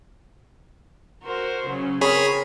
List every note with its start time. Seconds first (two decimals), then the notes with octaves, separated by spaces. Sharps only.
1.23 F#4 A#4 C5
1.65 C#3 F#3 C#4
2.01 C4 G#4 A#4 C#5 B5